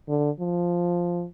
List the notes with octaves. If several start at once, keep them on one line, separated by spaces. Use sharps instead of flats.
D3
F3